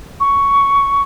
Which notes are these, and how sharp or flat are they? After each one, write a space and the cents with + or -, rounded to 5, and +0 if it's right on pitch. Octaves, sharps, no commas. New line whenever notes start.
C#6 +10